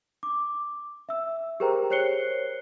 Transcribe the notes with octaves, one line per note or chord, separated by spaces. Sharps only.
D6
E5 E6
G4 G#4 A#4 C5 G5 A#5
C5 C#5 F#6 C7 C#7 G7